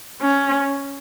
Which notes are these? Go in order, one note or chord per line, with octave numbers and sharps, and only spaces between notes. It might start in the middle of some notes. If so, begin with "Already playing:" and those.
C#4